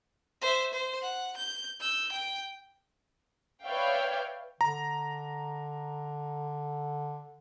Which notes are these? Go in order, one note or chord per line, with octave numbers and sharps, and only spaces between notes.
C5 E5
C5
F#5
G6
E6 G6
G5
B4 C#5 D5 E5 F5 G5
D3 A#5